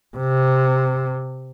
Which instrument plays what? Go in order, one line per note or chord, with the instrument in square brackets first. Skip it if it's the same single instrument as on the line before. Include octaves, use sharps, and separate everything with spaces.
[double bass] C3